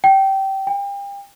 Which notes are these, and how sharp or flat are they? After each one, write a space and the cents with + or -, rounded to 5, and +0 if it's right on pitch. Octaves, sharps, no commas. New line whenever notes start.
G5 -20
G5 +35